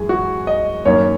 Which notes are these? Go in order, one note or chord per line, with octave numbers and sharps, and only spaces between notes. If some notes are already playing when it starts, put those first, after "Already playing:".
Already playing: F#2 E3 G#3 G#4
F#4
D#5
F#2 D#3 A#3 C#5